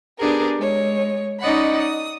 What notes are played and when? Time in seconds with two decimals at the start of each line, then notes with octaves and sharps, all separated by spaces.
0.20 B3 D4 G4 G#4 A#4
0.58 G#3 C#5
1.40 C#4 D#4 D5 D#5 F#5 B5
1.78 D#6